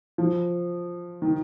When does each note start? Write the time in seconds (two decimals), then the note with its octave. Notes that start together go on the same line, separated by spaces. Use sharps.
0.18 F3
1.22 D#3